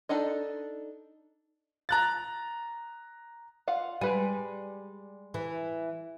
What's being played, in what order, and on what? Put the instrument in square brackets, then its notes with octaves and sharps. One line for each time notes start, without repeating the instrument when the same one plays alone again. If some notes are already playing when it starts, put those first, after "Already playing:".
[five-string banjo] D4 D#4 A4 D#5
[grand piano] A#5 F#6 A6
[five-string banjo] F4 F5 F#5
[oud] G3 [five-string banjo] G#3 B4 G#5
[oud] E3